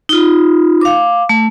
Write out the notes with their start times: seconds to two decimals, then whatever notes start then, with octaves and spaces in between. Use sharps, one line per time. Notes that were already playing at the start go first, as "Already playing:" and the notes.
0.09 D#4 F4
0.81 F5 D6
1.29 A3